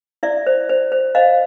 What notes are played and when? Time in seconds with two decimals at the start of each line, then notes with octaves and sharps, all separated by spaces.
0.23 E4 D5 E5
0.46 C5
0.69 C5
0.92 C5
1.15 C5 D#5 F5